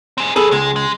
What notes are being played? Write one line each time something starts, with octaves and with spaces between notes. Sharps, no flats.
C4 G#4
F#3 G#4 A4 B4
C#2 G#3
G#3